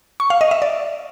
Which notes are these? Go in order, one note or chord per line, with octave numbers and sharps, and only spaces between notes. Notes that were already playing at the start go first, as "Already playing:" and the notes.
C#6
F5
D#5
E5
D5